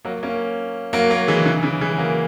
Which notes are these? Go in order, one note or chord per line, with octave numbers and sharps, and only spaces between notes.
F#3 A#3
A#3 C#4
F#3 A#3
F#3 A#3
E3 G#3
C#3 E3
C#3 E3
E3 G#3
F#3 A#3